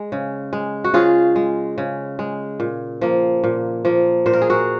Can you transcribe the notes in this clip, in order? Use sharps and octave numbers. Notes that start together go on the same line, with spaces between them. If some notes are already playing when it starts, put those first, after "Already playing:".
Already playing: G#3
C#3
G#3
F#4
C#3 F4 G#4
G#3
C#3
G#3
A#2
F3 A#3
A#2
F3 A#3
A#2 C5
A#4
G#4
F#4 A#4